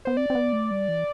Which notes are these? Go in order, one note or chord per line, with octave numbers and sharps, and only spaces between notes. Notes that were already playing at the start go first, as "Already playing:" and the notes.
B3 C5
C4 D5
C4
B3
A3
G3
E3